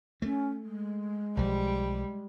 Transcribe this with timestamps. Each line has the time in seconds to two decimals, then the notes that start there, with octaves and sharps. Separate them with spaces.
0.22 A3 C#4
0.62 G#3
1.37 B1 F3 G3